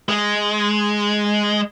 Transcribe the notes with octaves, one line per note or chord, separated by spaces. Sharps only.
G#3